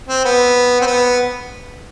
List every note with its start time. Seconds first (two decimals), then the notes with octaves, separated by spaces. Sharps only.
0.08 C4
0.24 B3
0.81 C4
0.87 B3